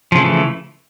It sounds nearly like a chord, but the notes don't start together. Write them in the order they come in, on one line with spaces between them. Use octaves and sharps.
F3 C#3 A3 E3